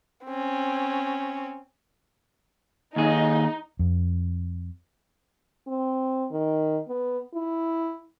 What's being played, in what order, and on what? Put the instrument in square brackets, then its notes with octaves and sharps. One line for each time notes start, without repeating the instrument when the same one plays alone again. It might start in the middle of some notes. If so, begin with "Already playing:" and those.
[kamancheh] C4 C#4
[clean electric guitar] D#2 G#4 [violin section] D#4
[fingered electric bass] F2
[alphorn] C4
D#3
B3
E4